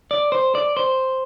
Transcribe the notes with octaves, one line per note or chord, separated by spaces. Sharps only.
D5
C5
D5
C5